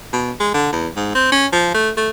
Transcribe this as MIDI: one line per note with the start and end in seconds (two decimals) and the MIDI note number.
0.13 0.31 47
0.40 0.51 56
0.54 0.71 50
0.72 0.88 40
0.96 1.14 44
1.15 1.29 60
1.32 1.46 61
1.52 1.73 53
1.74 1.90 57
1.97 2.10 57